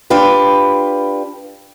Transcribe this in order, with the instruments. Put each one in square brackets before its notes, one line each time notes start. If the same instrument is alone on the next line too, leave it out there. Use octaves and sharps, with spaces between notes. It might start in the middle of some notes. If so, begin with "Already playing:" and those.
[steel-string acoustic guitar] D4 F4 G4 B4